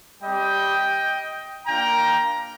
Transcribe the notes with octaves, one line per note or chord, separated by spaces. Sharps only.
G3 C4 G4 D#5 G5
A#3 D4 F4 G5 A#5